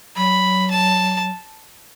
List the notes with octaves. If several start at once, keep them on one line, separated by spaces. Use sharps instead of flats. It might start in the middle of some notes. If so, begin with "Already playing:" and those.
F#3 B5
A5